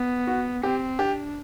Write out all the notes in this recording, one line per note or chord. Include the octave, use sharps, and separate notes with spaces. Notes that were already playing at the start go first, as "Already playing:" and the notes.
Already playing: B3
F#4
C4 G4
D4 G4